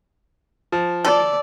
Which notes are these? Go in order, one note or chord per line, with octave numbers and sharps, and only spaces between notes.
F3
A4 D5